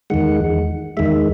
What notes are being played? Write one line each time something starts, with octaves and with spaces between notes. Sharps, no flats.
E2 D#3 G#3 F#5
E2 D#3 G#3 E5